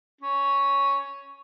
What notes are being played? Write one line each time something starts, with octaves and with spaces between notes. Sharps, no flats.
C#4